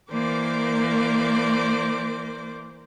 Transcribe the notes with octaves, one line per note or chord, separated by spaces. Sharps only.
E3 A#3 A#4 C5 D5 D6